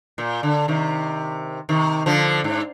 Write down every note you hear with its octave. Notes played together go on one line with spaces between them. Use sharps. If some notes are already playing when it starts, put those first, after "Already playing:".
A#2
D3
C3 D#3
C3 D#3
D3 F3
G#2